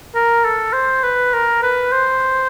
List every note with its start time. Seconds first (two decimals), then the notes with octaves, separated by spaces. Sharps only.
0.15 A#4
0.45 A4
0.73 C5
1.04 B4
1.33 A#4
1.63 B4
1.92 C5